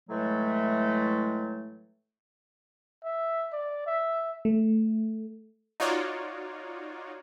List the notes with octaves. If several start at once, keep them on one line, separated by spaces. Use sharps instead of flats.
A2 E3 F#3 G#3 A3
E5
D5
E5
A3
D#4 F4 F#4 C#5 D5